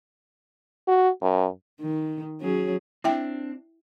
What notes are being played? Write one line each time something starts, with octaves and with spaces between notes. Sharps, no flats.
F#4
F#2
D#3
F#3 C#4 G#4
C4 D4 E4 E5 G5